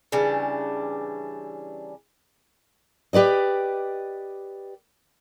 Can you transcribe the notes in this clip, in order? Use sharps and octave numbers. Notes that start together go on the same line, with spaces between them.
C#3 E3 G3 D4
G4 B4 D5 D#5